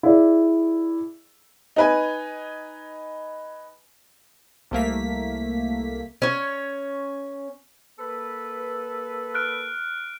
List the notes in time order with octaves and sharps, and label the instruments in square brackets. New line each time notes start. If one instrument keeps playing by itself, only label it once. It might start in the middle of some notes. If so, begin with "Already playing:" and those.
[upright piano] E4 G#4 D5
D#4 B4 G#5
[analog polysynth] C2 A3 A#3 B6
[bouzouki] C#4 C#5
[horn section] A#3 A4 B4
[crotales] F6 F#6 D7